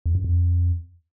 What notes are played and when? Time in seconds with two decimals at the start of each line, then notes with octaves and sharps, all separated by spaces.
0.06 E2
0.15 F#2
0.24 F2